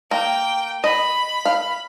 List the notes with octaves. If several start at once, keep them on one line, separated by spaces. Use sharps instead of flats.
A#3 G5
D#5 B5
F5